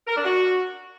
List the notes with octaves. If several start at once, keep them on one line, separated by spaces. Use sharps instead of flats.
A#4
D4
F#4